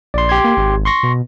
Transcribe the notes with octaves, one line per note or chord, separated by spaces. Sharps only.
A#1 D5 C6
G4 C6 G#6
A#3
G#1
C6 C#6 A#6
B2